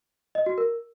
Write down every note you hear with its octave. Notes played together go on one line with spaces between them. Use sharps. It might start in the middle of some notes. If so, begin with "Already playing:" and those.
D#5
F#4
A#4